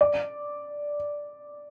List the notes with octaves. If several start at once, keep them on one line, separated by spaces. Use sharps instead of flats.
D5